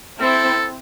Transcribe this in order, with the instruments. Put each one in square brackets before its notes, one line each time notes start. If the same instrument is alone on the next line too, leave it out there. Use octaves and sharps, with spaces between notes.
[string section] C4 E4 [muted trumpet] A4